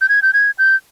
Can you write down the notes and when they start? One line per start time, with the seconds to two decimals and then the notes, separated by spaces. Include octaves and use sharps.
0.01 G6
0.09 G#6
0.22 G6
0.34 G#6
0.58 G6